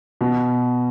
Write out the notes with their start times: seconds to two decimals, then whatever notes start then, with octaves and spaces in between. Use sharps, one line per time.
0.21 B2